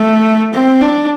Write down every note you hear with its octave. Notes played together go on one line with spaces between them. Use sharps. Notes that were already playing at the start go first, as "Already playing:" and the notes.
Already playing: A3
C4
D4